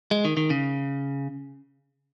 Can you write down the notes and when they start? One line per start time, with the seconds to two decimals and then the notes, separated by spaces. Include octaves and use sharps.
0.11 G#3
0.25 D#3
0.37 D#3
0.50 C#3